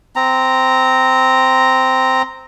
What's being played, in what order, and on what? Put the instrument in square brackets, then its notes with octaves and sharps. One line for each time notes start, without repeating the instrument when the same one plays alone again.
[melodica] C4 A#5